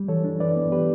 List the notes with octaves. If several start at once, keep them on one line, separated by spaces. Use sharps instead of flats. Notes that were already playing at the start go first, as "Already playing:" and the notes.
Already playing: G3
E3 A4 C#5
D4
E3 B4 D5
B3
E3 G4 B4